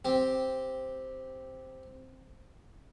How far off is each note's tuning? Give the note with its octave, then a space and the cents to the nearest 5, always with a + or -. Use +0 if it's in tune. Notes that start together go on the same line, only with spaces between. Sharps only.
C4 +0 G4 +0